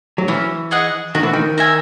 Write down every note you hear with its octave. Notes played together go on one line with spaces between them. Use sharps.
F#3
E3 C#4
G#4 D#5 F#5
D#3 F#4
E3
D#3
A#4 E5 G#5